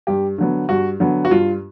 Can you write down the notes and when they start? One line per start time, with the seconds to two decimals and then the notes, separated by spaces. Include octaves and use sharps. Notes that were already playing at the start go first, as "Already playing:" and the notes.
0.07 G2 G4
0.38 D3 F#3 B3
0.69 G2 F#4
1.00 D3 F#3 B3
1.25 F#4
1.31 G2 F4